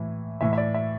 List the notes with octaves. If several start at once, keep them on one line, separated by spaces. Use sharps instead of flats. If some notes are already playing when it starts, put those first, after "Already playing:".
Already playing: A2 E3
A2 E3 E5
E5
D5
E5